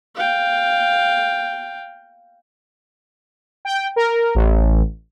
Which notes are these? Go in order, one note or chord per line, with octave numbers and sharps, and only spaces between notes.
F5 G5
G5
A#4
A1